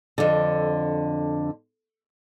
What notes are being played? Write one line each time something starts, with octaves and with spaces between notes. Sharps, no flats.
F2 D3